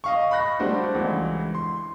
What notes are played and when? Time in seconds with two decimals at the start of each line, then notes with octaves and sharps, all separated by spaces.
0.04 D#5 F5 C#6
0.31 B5 C#6 F#6 A#6
0.60 G3 A3 D4 F#4 C5
0.95 C#2 E3
1.55 C6